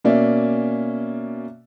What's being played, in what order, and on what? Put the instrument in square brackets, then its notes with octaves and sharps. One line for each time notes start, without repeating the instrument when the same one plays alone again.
[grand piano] B2 A#3 C#4 D5 E5